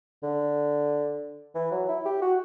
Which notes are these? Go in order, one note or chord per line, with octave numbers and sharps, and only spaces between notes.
D3
E3
F#3
E4
G4
F#4